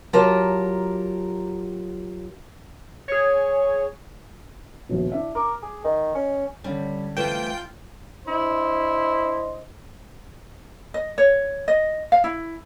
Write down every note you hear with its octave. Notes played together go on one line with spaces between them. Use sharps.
F#3 F4 G4 A#4 A5
G#4 C#5
A#1 D#2 B2
D4 E4 E5
A#4 D6
G#4
D#3 D#5
C#4
D3 G3 C#4
E3 A3 C4 F4 G5
D4 E4 C5 D#5
D#5
C#5
D#5
F5
E4